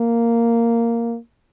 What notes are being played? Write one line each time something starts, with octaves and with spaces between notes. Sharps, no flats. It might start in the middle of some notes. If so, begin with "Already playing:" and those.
Already playing: A#3